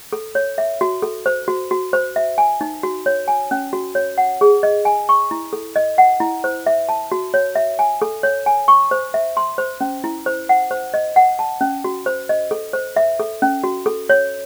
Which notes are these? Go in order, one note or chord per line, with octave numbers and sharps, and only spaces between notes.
A4
C#5
E5
F#4
A4
C5
F#4
F#4
C5
E5
G#5
D#4
F#4
C#5
G#5
C#4
F#4
C#5
F#5
G#4
D#5
G#5
C#6
E4
A4
D#5
F#5
E4
C5
E5
A5
F#4
C#5
E5
G#5
A4
C#5
G#5
C#6
C5
E5
C6
C5
C#4
E4
C5
F#5
C5
D#5
F#5
A5
C#4
F#4
C5
D#5
A4
C5
E5
A4
C#4
F#4
A4
C#5